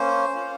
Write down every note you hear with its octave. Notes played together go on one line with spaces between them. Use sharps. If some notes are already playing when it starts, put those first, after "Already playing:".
Already playing: A#3 C#4 C5
A#3 C#4 F4